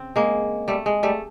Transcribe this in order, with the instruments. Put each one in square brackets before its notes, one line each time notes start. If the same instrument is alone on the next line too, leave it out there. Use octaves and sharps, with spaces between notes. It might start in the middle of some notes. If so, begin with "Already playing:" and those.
Already playing: [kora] C#3 C4
G#3 A#3
G3 A3
G#3
G3 A3